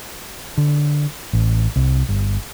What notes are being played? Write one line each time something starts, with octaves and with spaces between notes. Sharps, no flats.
D3
A1
C2
G1